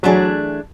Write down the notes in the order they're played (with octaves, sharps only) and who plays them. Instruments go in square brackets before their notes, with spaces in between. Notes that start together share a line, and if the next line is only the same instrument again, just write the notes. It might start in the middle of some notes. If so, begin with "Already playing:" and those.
[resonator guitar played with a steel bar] E3 A3 D4 G#4 [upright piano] F#3